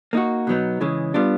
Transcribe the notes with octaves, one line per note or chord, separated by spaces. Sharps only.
A#3 D#4 F#4
B2 F#3 B3 D#4
C#3 E3 G#3
G3 B3 D4 F4